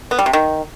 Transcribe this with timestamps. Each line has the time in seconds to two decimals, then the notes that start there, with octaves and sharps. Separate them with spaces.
0.11 B3
0.19 G3
0.26 C3
0.33 D#3